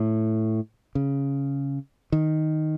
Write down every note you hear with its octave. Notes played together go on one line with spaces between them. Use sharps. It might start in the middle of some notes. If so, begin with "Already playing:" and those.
Already playing: A2
C#3
D#3